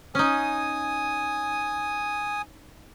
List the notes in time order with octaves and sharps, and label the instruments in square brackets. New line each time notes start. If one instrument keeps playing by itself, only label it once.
[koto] C#4 D#4 [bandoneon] G#5 D#6